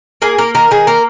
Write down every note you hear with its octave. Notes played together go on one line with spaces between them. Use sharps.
A#3 G#4
A#3 A#4
D#3 A#4
D#3 G#4
A#3 A#4